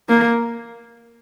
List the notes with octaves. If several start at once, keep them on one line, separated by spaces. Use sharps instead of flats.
A#3